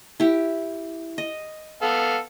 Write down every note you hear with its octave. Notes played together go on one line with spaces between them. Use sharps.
E4 G4
D#5
B3 A4 F5